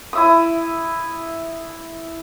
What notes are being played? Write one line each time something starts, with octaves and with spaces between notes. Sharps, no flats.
E4 E5 D#6